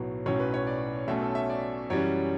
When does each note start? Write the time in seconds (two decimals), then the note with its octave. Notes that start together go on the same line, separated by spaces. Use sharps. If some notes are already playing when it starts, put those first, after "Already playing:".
Already playing: B1 A2 F#3 B3
0.26 B1 A2 F#3 C#4 C#5
0.40 B4
0.54 C#5
0.67 D5
1.08 B1 B2 A3 C#4 E5
1.22 A4
1.35 E5
1.50 D5
1.90 F#2 E3 G3 C#4 C#5